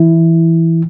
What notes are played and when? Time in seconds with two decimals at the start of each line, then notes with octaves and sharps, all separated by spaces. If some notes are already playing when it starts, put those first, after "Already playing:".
Already playing: E3 E4